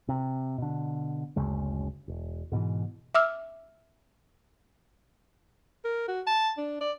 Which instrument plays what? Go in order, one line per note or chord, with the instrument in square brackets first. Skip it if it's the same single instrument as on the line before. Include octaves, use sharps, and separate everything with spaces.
[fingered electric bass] C3
B2 D3
F#1 D2 C#3 G#3
E1
G#2 B2 D#3 E3
[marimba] E5 D6 E6 F6
[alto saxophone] A#4
F#4
A5
D4
D5